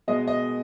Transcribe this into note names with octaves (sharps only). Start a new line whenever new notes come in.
B2 G#3 D#5
D#5